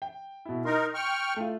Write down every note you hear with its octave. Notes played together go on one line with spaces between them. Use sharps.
G5
B2 E4
D#4 A#4 C6
G5 C#6 F6
A3 F4